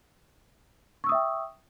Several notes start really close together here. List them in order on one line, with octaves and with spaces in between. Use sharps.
C#6 E6 D#6 E5 G5